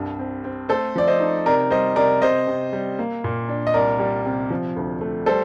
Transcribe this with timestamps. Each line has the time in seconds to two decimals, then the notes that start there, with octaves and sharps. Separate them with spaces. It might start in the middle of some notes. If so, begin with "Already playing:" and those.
Already playing: C2 G2
0.19 C4
0.44 C4
0.69 A3 A4 C5
0.96 F3 D5
1.07 C5 D#5
1.20 D#4
1.46 C3 A#4 D5
1.71 G3 C5 D#5
1.96 C3 A#4 D5
2.22 C3 C5 D#5
2.47 C3
2.73 G3
2.99 A#3
3.24 A#2
3.49 D4
3.67 D#5
3.74 C2 A#4 D5
3.99 G3
4.26 C3
4.50 F3
4.76 D2
5.01 A3
5.26 G3 A4 C5